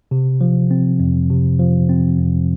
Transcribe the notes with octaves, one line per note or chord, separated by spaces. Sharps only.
C3
F3
C4
F2
C3
F3
C4
F2